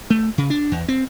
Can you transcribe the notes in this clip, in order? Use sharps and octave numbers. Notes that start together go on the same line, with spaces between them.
A3
C#3
D4
E2
C4